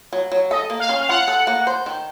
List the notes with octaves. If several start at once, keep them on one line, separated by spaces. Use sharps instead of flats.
F#3
F#3
A4 D#5
A#3
F5
C#4
F5
F4 F#5
A4
A#3
C5
D#3